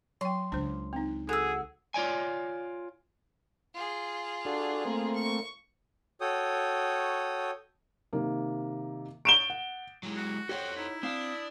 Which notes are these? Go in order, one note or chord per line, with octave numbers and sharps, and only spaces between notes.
F#3 G5 C6
C#2 D4 C5
C4 D#4
F#4 G#4 A4 E6
F4 C#5 D5 G#5
F4 G#4
D4 F#4 A4
A3 A#3 C4
C#6
F#4 A4 C#5 G5 D#6
C3 D#3 A#3
C#6 G6 D7 E7 G7
F#5
F#3 G#3 E4
F#4
G4 A4 C5 C#5 F#5 G5
D#4 E4
C4 D4 F5 D#6